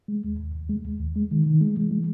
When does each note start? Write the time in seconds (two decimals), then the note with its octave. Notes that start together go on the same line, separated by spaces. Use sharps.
0.08 G#3
0.24 D#2
0.39 D#2
0.54 D#2
0.70 G#3
0.85 D#2
1.00 D#2
1.16 G#3
1.31 D#3
1.46 D#3
1.61 G#3
1.77 E3
1.91 G#3